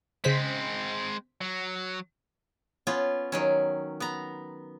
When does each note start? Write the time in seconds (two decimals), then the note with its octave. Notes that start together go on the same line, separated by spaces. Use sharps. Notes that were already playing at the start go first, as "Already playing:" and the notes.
0.24 C#3 G#3 C4 C5 B6
1.41 F#3
2.87 B3 C#4 F4
3.32 D#3 F#3 C#4
4.00 B3 A#5